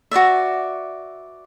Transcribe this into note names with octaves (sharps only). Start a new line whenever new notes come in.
F#4 B4 D5 E5